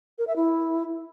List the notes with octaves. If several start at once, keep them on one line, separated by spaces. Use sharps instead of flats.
A#4
E5
E4